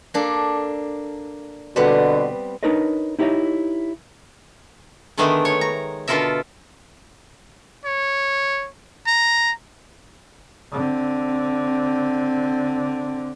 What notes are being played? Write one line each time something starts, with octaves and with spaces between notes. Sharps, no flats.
A#3 D4 A4
B2 D3 G3 B3 C4
D4 D#4 A#4 B4 C#5 D#5
D#4 E4 G4 A4 C#5 D#5
D3 D#3 G#3 A3 B3 D4
C#5
A#5
B2 D3 F4 A4 A#4 E5
C#5
A#5
D3 C4